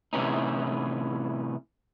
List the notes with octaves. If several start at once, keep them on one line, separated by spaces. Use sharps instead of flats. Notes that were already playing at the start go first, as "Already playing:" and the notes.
A2 C3 E3 B3 C#4 D#4